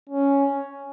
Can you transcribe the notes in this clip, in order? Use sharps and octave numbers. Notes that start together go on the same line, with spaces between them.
C#4